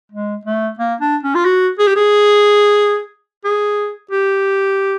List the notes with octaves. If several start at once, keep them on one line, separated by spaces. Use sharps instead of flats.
G#3
A3
A#3
D4
C#4
F4
F#4
G#4
G4
G#4
G#4
G4